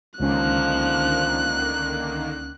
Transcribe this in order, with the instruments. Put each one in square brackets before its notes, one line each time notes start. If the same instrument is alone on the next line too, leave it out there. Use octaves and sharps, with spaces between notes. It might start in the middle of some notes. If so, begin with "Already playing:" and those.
[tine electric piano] C#2 C#4 [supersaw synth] D3 D#3 A#3 [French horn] F3 [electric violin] F#6